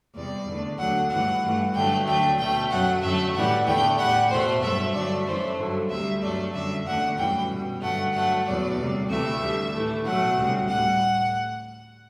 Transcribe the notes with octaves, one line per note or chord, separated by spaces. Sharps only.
E2 C3 G3 D5
E2 D3 A3
D2 D3 F#3 F#5
G2 E3 A3 F#5
G2 E3 A3
G2 D3 F#3 A3 G5
D2 D3 F#3 A3 G5
B2 A3 G5
F#2 F#3 A3 F#5
F#2 D3 F#3 A3 E5
A2 E3 G3 F#5
E2 D3 A3 G5
A2 G3 F#5
E2 B2 A3 C5
G2 F#3 A3 E5
G2 D3 F#3 A3 D5
F#2 E3 A3 C5
G2 D3 F#3
D2 C3 G3 E5
G2 F#3 A3 D5
F#2 D3 G3 E5
E2 D3 A3 F#5
F#2 E3 G3 G5
B2 G3
G2 D3 F#3 A3 F#5
G2 F#3 A3 F#5
E2 B2 F#3 D5
D2 C3 G3
D2 C3 E3 A3 E5
D2 D3 G3
A2 E3 A3
B2 F#3 A3 F#5
D2 C3 G3
A2 G3 F#5